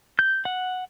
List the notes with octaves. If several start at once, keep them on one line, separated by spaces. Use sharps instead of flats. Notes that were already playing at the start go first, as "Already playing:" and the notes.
G6
F#5